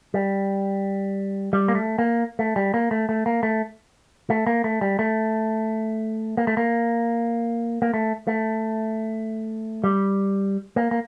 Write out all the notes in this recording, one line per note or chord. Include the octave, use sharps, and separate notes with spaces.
G3
G3
A#3
A3
A#3
A3
G3
A#3
A3
A3
A#3
A3
A3
A#3
A3
G3
A3
A#3
A3
A#3
A#3
A3
A3
G3
A#3
A#3